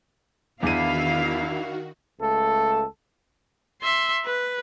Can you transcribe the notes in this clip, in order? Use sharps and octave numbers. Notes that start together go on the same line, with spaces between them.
E2 D#3 D4 E4 F#4 F5 D#7
C#2 A3 A4
E5 C6
B4